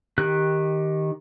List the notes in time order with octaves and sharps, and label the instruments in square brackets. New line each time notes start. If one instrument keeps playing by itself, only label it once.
[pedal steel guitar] D#3 G4 F#6